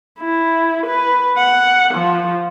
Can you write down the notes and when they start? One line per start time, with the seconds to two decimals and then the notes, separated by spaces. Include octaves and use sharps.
0.20 E4
0.87 B4
1.37 F#5
1.94 F3